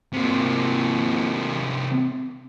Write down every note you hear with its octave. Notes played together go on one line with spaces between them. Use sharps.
C3 A#3